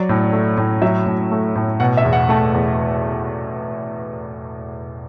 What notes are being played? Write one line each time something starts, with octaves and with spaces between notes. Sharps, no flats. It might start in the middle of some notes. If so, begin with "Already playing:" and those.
Already playing: F#3 D5
A2
A3
A2
F#3 E5
A2
A3
A2
B2 F#5
E5
E2
F#5
A3 A5
E2